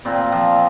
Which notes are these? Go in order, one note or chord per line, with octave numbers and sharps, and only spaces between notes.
A#2 C4
F3